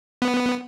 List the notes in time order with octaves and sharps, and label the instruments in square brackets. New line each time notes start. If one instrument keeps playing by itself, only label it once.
[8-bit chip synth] B3